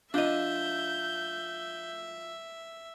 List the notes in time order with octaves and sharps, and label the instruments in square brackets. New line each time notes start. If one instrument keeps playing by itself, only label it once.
[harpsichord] F3 [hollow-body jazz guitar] D4 D#5 [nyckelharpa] E5 [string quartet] G6